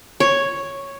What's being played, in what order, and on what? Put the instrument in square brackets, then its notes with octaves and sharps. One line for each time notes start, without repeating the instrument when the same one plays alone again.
[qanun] C#5